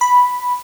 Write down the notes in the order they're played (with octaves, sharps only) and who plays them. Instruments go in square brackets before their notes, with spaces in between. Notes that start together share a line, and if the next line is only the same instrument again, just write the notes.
[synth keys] B5